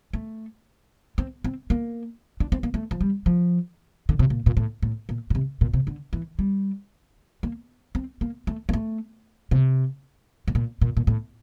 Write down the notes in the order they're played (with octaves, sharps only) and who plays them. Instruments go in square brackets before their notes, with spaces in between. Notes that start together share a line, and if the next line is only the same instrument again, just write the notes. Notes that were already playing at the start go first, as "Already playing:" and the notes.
[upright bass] A3
C4
C4
A#3
D4
C4
A#3
A3
F3
G3
F3
D3
C3
A#2
A#2
A2
A2
A#2
A#2
C3
A#2
C3
D3
E3
G3
A#3
C4
A#3
A3
A#3
A3
C3
A2
A#2
A#2
A#2
A2